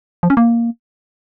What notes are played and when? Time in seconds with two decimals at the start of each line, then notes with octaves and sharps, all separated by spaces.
0.23 F3
0.30 C#4
0.37 A#3